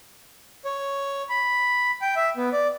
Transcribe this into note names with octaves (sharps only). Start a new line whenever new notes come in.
C#5
B5
G5
E5
B3
D5